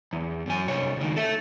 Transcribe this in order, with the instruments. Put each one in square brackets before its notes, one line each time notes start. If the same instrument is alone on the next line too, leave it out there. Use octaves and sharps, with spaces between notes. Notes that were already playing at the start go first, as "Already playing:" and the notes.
[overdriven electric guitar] E2
F#2 G#5
C2 C#5
C#2 D#3
A4 E5